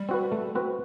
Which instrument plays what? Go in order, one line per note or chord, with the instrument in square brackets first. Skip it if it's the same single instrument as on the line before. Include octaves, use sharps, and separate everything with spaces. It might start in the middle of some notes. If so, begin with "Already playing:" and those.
Already playing: [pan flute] G3
[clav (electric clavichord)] C4 F#4 B4
A3
C4 F#4 B4